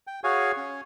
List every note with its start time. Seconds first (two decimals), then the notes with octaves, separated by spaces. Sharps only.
0.07 G5
0.24 F#4 G#4 C#5 F5 G#5
0.57 C#4 C#5